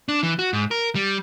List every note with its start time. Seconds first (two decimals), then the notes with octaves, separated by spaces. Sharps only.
0.09 D4
0.23 E3
0.39 F#4
0.53 G#2
0.71 A#4
0.95 G3